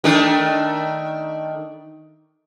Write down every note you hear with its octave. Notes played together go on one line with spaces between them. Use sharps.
D#3 A3 D4